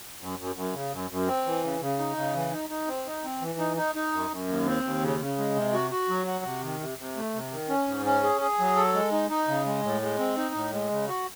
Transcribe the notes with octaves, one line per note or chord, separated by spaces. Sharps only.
F#2
F#2
F#2
C#3
F#2
F#2
C4
E3
C#3
C#3
D#4
C#3
E3
D#4
D#4
C4
D#4
C4
E3
D#4
D#4
D#4
F#2
F#2
D#2
C4
D#2
C#3
C#3
G#3
C3
F#4
F#4
F#3
F#4
C3
D#3
C3
C3
A3
C3
D#3
C#4
G#2
C#4
G#4
G#4
F#3
A4
G#3
D#4
D#4
C#3
G#3
A2
G#3
C4
D#4
A2
G#3
C#3
F#4